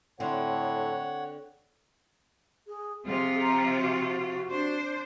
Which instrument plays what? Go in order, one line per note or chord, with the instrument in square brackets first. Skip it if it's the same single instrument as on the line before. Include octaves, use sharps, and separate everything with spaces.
[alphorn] A2 [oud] D3 C4 [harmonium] C#5 F#5
[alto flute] G#4
[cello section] C3 F3 F4 [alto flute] G#4
[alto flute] A#5
F#4
[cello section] D4 C5